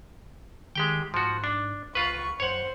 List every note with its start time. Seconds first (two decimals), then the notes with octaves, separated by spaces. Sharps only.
0.75 D#3 G#3 G4 G5
1.14 G#2 F3 F#4
1.44 D4
1.95 C#2 F4 B4 C#6
2.40 F#2 C5 C#5 F#5